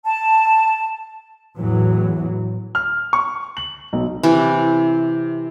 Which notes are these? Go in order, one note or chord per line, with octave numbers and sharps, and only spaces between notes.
A5
E2 A2 E3 F#3
F6
C#6
F#7
B1
C3 E3